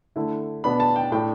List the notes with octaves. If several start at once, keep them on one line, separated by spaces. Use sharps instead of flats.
D3 A3 E4
B2 B3 D4 B5
A5
G5
A2 A3 D4 G5